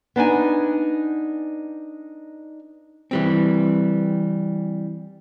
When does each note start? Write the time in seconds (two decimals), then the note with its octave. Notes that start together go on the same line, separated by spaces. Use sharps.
0.16 B3 D4 D#4 G#5
3.11 E3 G3 C4